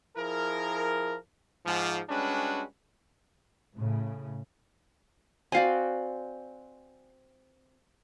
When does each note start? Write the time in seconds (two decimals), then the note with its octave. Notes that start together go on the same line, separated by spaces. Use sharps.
0.17 F3 E4 G#4 A#4
1.65 G#2 F3
2.10 G3 G#3 C#4 D4 F#4 B4
3.77 A2 C#3
5.52 C4 F#4 D5 F5 G#5